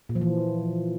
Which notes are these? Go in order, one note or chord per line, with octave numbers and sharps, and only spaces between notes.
A#2
F3
E3